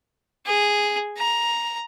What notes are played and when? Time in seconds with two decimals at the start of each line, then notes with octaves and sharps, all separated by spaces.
0.46 G#4
1.18 A#5